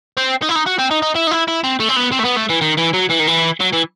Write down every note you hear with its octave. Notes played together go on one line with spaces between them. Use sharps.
C4
D#4
E4
D#4
F#4
C4
D#4
D#4
E4
D#4
E4
E4
C4
A3
C4
B3
C4
A3
B3
A3
E3
D#3
E3
F#3
E3
D#3
E3
F#3
E3